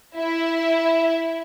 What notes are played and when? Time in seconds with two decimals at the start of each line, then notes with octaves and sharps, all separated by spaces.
0.16 E4 E5